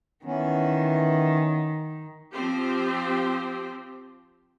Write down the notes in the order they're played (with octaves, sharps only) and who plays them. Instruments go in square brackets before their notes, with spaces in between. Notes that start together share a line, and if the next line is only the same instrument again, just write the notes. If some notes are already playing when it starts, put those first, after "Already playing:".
[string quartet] D#3 [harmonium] E3 B3 C#4
[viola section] F3 C4 G4 C5